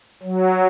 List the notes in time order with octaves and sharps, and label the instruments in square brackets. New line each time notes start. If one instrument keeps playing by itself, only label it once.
[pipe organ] F#3